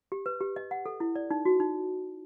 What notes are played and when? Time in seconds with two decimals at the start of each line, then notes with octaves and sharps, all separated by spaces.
0.12 G4
0.26 B4
0.41 G4
0.56 D#5
0.71 F#5
0.86 A4
1.00 E4
1.15 D5
1.31 D#4
1.45 F#4
1.60 D#4